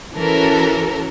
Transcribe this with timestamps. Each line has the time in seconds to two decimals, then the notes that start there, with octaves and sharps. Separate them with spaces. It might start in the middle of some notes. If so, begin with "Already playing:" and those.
0.13 E3 C#4 F#4 A4 A#4